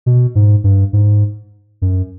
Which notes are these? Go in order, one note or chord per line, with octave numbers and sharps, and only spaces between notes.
B2
G#2
G2
G#2
F#2